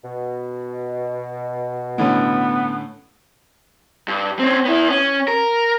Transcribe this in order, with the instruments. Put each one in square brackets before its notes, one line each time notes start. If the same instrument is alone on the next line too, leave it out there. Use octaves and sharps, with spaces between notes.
[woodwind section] B2
[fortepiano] A2 D3 C#4 [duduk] B3
[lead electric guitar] G2
C4 C#4
B3 E4
C#4
A#4